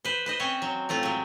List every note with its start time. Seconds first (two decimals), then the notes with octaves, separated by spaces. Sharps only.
0.05 B4 C5
0.26 B4 C5 D#5
0.40 C4 C#4 C5 C#5
0.62 F#3
0.89 A2 A3 C4 F4
1.03 F#3 G#3